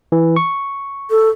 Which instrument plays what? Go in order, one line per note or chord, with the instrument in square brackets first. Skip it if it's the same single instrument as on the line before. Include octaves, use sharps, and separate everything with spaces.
[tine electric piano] E3
C#6
[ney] A4